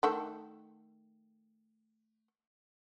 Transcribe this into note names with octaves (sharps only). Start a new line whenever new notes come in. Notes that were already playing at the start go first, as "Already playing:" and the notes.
D#3 A3 A4